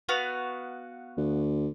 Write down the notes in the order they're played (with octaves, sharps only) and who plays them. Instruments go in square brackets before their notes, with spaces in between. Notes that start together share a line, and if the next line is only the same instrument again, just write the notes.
[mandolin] B3 F#4 F5
[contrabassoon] D2